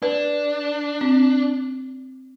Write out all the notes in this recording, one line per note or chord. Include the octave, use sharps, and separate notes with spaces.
D4 B4
C4